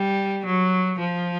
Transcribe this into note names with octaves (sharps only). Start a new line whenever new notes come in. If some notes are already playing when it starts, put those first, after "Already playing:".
Already playing: G3
F#3
F3